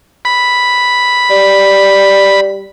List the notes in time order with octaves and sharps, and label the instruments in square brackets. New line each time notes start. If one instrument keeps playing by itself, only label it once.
[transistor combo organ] B5
[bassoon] G3